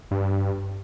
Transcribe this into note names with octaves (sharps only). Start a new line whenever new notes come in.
G2